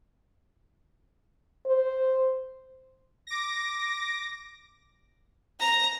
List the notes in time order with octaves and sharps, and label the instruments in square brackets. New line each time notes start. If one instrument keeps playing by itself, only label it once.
[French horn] C5
[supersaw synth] D6 A#6
[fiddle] A#5